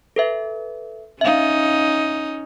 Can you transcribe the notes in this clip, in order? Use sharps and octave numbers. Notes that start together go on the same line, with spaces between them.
A4 B4 E5
C#4 D#4 E5 F5